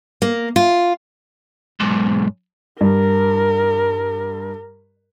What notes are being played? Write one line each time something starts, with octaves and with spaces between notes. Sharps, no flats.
A#3
F4
B1 G#2
G2 A#4